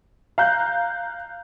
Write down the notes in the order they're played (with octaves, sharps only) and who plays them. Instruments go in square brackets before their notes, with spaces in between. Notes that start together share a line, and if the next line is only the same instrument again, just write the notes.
[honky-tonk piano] F5 A#5 F#6 G6